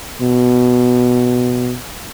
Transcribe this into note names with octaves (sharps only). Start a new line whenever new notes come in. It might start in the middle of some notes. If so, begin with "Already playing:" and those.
B2